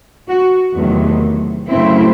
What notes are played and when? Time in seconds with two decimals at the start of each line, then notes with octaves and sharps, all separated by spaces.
0.29 F#4
0.76 E2 C3 D#3 F#3 A3
1.70 F#2 C#3 F#3 A3 C4 E4